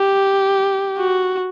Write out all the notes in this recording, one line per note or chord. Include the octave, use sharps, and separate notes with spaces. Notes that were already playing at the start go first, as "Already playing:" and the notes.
Already playing: G4
F#4